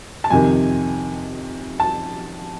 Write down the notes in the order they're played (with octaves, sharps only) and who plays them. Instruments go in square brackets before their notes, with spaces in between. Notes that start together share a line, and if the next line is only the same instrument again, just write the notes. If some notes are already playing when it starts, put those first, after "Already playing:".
[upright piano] A5
F2 C3 D#3 G#5
A5